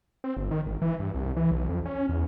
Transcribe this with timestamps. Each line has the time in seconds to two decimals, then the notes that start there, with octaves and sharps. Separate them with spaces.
0.24 C4
0.37 G1
0.51 D#3
0.67 G#1
0.82 E3
0.99 G2
1.14 C2
1.37 E3
1.52 B1
1.69 F2
1.85 C#4
2.09 E2